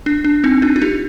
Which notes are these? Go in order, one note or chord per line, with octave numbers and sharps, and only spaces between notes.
D4
D4
C4 D#4
D4 F4
F4
D#4 G4